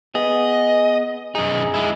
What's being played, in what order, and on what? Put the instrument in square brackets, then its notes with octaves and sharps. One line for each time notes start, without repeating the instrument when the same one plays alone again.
[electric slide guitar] B3 G#4 [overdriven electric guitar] D#5
[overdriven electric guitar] F#2 D#4 [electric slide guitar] G#4
[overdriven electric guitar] G#3 E4